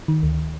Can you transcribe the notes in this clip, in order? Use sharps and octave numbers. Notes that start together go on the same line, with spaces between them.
D#3
D2